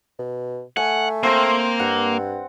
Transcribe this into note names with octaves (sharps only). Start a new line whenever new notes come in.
B2
A3 F#5 G#5
A#3 C4 G5 C6
G2 F#5